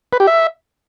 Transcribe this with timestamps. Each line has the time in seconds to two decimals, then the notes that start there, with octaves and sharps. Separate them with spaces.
0.13 B4
0.20 G4
0.27 E5